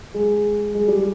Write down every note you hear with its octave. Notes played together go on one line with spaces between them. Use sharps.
G#3
G#3
G3